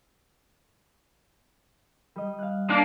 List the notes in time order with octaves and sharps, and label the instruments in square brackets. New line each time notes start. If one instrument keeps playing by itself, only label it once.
[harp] G3 D#5
F5 F#6
[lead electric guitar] A#3 [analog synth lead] D4 [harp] C6